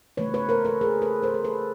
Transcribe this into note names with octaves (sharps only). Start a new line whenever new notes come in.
C#3 E3 A3 B4 C#5
B4 C#5
A#4 C5
A4 B4
G#4 A#4
A4 B4
A#4 C5
C5
A4 B4